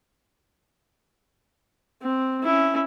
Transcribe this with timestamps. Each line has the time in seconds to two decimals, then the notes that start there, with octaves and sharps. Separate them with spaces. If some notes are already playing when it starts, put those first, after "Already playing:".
2.02 C4
2.43 C#4 E4